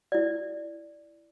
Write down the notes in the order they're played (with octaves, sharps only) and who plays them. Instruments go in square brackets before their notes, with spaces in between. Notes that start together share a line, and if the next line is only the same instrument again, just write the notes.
[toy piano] E4 D5